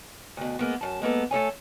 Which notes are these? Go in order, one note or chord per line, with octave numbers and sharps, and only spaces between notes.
D2 B2
G#3 A#3 B3
F#2 A5
G#3 A#3 B3 A4
A3 A4 C#5 G#5